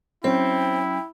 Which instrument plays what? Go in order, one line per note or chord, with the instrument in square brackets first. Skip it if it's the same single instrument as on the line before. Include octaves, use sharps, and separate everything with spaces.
[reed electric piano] F#3 C#4 [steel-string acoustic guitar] C4 [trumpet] E4 [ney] G5